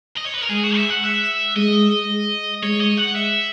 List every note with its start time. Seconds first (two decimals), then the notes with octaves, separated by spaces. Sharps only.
0.17 D#5
0.26 C#5
0.34 B4
0.43 A#4
0.50 G#3 G#4
0.64 F#4
0.76 E5
0.90 F#5
1.04 E5
1.56 G#3 D#5
2.63 G#3 C#5
2.81 D#5
2.98 F#5
3.16 E5